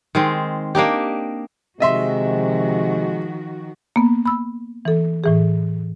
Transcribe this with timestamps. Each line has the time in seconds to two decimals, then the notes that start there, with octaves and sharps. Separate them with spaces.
0.15 D#3 G#3 C4
0.75 A#3 D4 D#4 G4
1.80 C3 D#3 F3 G#3 F#4 D#5 E5 C6
3.96 A#3 B3
4.25 B5 E6
4.85 E3 A4
5.24 A2 E3 G#4